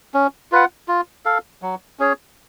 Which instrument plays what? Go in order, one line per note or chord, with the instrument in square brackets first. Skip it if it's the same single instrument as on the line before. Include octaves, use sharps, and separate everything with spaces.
[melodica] C#4
F4 B4 F#5
F4
A4 F5
F#3
C#4 G#4 C#5